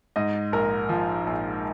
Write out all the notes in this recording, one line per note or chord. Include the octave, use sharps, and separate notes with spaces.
G#2 D#5
A#1 A#4
F3
A#1